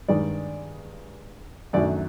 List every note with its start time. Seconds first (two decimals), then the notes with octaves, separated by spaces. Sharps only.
0.09 G2 D#3 G#3 D5
1.73 F#2 D#3 F#3 A3 D4 D5